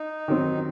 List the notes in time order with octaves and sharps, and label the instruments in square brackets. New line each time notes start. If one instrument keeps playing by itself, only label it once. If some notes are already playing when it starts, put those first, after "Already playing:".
Already playing: [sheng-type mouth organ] D#4
[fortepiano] D#3 F#3 C4